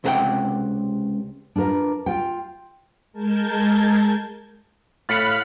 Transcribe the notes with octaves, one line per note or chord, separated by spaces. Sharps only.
C#2 C3 F#4 A#4 F#5 G5
D4 F4 F#4 A#4 B4
F4 G5
G#3 A#4 A5 G6 G#6
A2 F5 B5 F#6 A6 C7 C#7